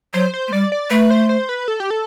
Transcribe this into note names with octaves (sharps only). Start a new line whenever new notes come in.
F#3 C5
C5
A3
G3 D5
D5
A3 B4
C5
C5
B4
A4
G4
A4